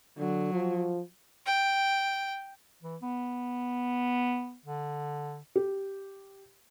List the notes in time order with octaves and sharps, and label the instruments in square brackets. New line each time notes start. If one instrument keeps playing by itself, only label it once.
[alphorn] D3 [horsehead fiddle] F#3
[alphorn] F3
[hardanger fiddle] G5
[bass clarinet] E3
B3
D3
[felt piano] G4